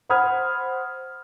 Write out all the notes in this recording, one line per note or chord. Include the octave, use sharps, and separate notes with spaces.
C5 F#5 B5 D#6 F6 G#6